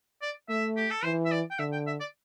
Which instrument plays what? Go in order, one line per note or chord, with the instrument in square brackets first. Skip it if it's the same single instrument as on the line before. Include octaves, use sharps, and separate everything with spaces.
[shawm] D5
[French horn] A3 [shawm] E5
[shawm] G4
A4
[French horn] E3 [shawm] C5
[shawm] E5
D5
G5
[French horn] D3 [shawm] E5
[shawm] G5
E5
D5